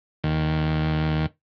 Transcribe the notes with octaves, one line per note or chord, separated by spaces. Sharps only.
D#2